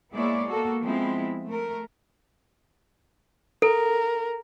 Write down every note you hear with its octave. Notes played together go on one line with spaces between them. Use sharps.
G#3 A#3 B3 E4 C#5 D5
A#3 F#4 A4
F3 G#3 B3 C4 E4
A3 A#4
A4 A#4